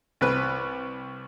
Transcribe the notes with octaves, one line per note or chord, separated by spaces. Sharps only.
C2 B4